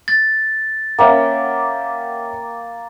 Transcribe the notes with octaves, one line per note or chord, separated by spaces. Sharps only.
A6
A#3 C#4 E5 F#5 G5